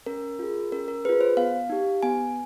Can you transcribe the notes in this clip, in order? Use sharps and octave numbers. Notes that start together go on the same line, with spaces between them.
C#4 A#4
F4 G#4
C#4 A#4
A#4
F4 G#4 B4
C5
B3 F5
D#4 G4
B3 G#5